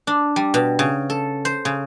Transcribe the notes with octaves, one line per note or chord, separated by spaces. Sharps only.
D4
G3
B2
C#3
A4
C5
C#3